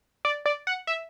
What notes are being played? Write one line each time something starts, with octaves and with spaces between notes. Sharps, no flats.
D5
D5
F#5
E5